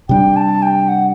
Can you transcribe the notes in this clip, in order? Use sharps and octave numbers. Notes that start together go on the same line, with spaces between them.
C3 G3 D4 G5
A5
G5
F#5